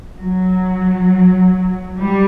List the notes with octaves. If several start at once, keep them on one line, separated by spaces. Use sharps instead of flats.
F#3
G3